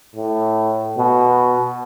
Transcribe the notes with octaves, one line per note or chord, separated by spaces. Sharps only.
A2
B2